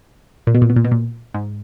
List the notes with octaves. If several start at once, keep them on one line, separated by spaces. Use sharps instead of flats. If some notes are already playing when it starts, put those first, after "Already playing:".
A#2
B2
A#2
B2
A#2
B2
A#2
G#2